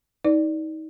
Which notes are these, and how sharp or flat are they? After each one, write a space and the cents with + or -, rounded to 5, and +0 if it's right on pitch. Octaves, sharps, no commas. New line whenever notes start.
D#4 +25 B4 +30 D5 +0